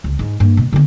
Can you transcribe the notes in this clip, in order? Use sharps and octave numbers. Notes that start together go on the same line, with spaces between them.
C#2
G#2
G2 A#3
B2
D3 B3